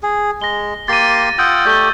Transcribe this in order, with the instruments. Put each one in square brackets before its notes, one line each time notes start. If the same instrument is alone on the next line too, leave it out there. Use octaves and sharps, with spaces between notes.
[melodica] G#4
[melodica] G#3 [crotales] A#6 G7
[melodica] A#3 G4 C6 [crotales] A6 D#7
[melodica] F4 F#5 G5 [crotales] D#6 E6 G6
[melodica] A3 G4 D5 [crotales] G6 A6 G7